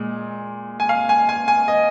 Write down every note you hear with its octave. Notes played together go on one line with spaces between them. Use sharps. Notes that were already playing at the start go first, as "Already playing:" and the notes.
Already playing: A#2 G#3
G#5
F5
G#5
G#5
G#5
D#5